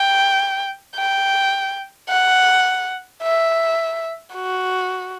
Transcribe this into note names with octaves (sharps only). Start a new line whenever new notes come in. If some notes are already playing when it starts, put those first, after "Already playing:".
Already playing: G5
G5
F#5
E5
F#4